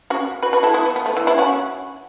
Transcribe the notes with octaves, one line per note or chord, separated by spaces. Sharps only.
C#4 F#4
F#4 B4
F#4 B4
E4 A4
B3 E4
B3
B3
A3
E3
B3 E4
C#4 F#4